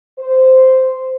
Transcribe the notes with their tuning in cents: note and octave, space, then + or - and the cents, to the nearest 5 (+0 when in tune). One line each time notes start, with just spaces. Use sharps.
C5 -10